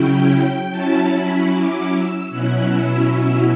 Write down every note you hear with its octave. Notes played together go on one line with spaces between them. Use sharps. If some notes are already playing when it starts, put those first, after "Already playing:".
Already playing: C#3 F#3 C#4 E4 G5
F#3 C#4 E4 A5
B5
D6
E6
B2 F#3 C#4 E4 F#6
E6
E6